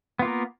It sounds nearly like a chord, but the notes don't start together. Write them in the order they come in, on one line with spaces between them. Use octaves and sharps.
B3 F4 A#3 A#4